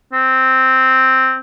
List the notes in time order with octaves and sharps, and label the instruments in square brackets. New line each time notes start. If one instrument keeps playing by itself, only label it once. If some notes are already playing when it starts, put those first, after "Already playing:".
[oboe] C4